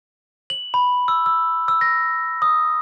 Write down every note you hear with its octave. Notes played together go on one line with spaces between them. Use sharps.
F#7
B5
E6
E6
E6
A#6
D#6